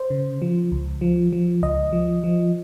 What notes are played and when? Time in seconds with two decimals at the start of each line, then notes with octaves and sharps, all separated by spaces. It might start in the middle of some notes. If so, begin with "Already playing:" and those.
Already playing: C5
0.10 C#3
0.42 F3
0.72 C#2
1.01 F3
1.33 F3
1.62 C#2 D#5
1.93 F3
2.24 F3